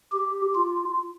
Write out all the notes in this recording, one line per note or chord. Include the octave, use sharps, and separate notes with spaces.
G4
F4